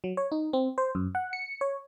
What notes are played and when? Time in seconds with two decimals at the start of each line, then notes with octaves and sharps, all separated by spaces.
0.04 F#3
0.17 C#5
0.32 D#4
0.53 C4
0.78 C5
0.95 F#2
1.15 F#5
1.33 C#7
1.61 C#5